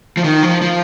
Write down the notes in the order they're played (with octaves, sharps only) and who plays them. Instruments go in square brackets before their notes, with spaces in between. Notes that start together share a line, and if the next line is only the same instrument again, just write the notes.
[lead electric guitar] F3
D#3
F3
F3